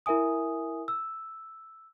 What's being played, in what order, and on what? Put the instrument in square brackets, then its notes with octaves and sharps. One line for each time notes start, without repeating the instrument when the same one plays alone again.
[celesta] E4 A#4 E5 G#5 D#6
E6